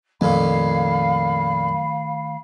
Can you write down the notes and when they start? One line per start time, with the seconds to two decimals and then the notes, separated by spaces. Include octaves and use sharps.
0.21 F2 A#2 D#3 A3 F5 B5